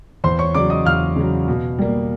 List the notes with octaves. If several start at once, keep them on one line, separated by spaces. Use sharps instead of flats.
E2 C5 C6
C#5 C#6
C#3 F#3 D5 D6
D#5 D#6
E2 F5 F6
C#3 F#3
B2
G3 A#3